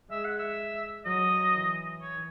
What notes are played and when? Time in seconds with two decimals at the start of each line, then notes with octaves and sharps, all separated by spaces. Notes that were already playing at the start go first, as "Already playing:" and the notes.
0.11 G#3 E5
0.25 F#5
0.38 E5
1.05 F#3 D#5
1.53 E3
2.01 C#5